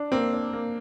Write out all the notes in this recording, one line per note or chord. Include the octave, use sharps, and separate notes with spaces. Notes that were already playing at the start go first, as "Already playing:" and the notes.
Already playing: D4
A#3 C4
D4
A#3